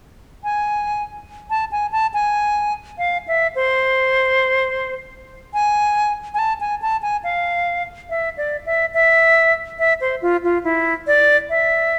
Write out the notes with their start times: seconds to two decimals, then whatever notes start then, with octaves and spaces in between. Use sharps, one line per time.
0.44 G#5
1.50 A5
1.72 G#5
1.92 A5
2.14 G#5
2.98 F5
3.28 E5
3.55 C5
5.54 G#5
6.34 G#5
6.39 A5
6.60 G#5
6.82 A5
7.02 G#5
7.24 F5
8.10 E5
8.37 D5
8.66 E5
8.94 E5
9.79 E5
10.01 C5
10.22 F4
10.44 F4
10.64 E4
11.07 D5
11.50 E5